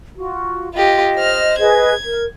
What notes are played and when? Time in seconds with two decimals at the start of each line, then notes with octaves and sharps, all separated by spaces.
0.17 F4 F#4
0.74 F4 G4 D#5
1.15 C5 F6
1.59 G#4 B4 D#5 G#6
2.04 A#4